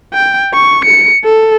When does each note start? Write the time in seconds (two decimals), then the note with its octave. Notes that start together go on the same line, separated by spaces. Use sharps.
0.14 G5
0.54 C#6
0.85 C#7
1.24 A4